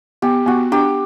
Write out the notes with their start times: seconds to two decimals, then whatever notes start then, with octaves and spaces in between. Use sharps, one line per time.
0.22 B3 G4
0.46 B3 F#4
0.72 D4 G4